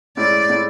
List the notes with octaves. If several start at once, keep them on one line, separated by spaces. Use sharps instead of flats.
A2 G#3 C#4 E4 D5
A2 G#3 C#4 E4